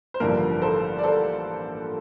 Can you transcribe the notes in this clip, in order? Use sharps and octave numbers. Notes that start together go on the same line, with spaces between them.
C5
A1 G2 D3 F3 A#3 A#4
A4 C5
D5
A4 C5